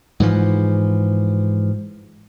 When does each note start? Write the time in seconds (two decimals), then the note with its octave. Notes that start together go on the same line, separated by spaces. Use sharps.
0.20 G#2 E3 F3